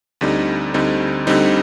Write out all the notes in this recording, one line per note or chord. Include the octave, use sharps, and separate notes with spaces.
D2 D3 G3 C4 D#4
D2 D3 G3 C4 D#4
D2 D3 G3 C4 D#4